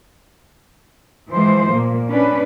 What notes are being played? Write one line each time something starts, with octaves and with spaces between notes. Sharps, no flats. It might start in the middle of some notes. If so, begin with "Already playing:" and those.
E3 F3 G#3 C5
A#2 A#3
C#4 D4 B4